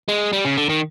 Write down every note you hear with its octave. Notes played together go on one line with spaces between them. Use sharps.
G#3
G3
C#3
D3
D#3